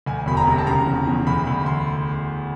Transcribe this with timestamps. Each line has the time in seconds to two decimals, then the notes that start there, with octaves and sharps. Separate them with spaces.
0.06 D2 G#5
0.26 E1 B5
0.37 A#5
0.47 C3
0.58 A5
0.66 C#3 A#5
0.86 E2
1.07 E2
1.27 D2 B5
1.47 D2 B5
1.66 C6